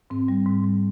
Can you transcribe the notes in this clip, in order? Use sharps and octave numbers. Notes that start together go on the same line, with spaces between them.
G#2 C4
G3
G#2
G3